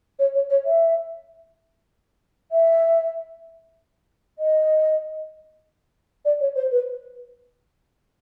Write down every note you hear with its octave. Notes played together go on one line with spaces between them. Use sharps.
C#5
C#5
C#5
E5
E5
D#5
D5
C#5
C5
B4